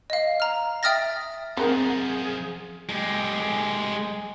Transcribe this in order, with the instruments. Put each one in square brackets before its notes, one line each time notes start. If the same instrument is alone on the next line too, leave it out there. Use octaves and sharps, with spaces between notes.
[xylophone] D#5 F5
A#5 F6
E5 G5 D#6 F6 A6 A#6
[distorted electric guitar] F#2 F3 [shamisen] G#3 A#4 [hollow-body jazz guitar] C4 F#5 [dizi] G#4
[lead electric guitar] G#3 G4